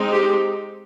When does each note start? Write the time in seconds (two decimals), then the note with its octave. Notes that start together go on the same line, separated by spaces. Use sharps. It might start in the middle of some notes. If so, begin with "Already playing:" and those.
Already playing: G#3 C4 D#4
0.11 G4